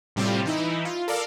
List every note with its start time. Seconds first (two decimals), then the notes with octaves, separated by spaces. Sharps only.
0.16 A2 C3 G3 C4 F4 G4
0.45 E3 D#4 E4
0.85 F4
1.08 A4 A#4 D5 F5